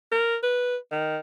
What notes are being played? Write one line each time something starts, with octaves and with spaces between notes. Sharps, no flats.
A#4
B4
D#3